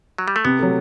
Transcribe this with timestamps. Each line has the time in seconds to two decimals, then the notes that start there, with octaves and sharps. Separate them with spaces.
0.18 F#3
0.28 G3
0.36 A3
0.45 C3 B3
0.59 F#3 A3